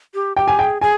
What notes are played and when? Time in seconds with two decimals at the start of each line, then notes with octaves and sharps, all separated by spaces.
0.14 G4
0.37 G4 G5
0.48 G#5
0.58 G#4 G5
0.81 G#4 G#5